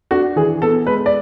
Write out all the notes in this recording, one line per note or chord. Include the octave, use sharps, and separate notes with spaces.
D4 F#4
E3 G#4
B3 A4
G#3 B4
D5